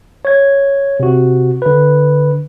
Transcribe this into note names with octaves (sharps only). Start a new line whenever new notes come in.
C#5 G#6
C3 F#4
D3 B4